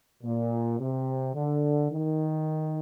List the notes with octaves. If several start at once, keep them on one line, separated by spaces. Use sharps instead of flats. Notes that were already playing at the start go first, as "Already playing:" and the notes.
A#2
C3
D3
D#3